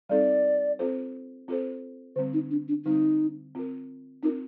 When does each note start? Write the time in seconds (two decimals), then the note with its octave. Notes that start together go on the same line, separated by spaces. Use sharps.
0.09 G3 C4 D#4 A4 D5
0.79 C4 F4 A4 C5
1.48 C4 F4 A4 C5
2.16 D3 G3 C4 C5
2.34 D#4
2.51 D4
2.68 D4
2.85 D3 G3 C4 D#4
3.55 C4 F4 A#4
4.23 C4 D#4 F4 A#4